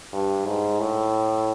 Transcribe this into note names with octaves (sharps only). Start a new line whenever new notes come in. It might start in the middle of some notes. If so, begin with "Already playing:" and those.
G2
G#2
A2